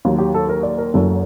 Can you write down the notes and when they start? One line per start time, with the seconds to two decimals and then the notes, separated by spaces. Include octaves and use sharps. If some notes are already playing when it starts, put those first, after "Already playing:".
0.05 D#2 D#3 F#3
0.19 G4
0.34 A4
0.49 A#4
0.63 D5
0.78 A#4
0.94 F#1 F#2 F#3 A4